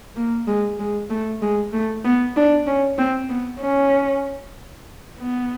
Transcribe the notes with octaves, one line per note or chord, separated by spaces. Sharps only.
A#3
G#3
G#3
A3
G#3
A3
B3
D4
C#4
C4
B3
C#4
B3